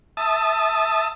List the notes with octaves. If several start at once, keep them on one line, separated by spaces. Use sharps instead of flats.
E5 A5 D#6